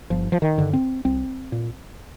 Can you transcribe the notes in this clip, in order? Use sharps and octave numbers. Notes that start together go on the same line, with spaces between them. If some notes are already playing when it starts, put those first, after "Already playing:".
G1 F3
F3
D#3
G2 D3
C4
C2 C4
A#2